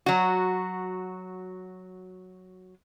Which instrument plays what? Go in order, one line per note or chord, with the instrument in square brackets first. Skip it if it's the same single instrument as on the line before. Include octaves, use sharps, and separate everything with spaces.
[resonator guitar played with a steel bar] F#3 F#4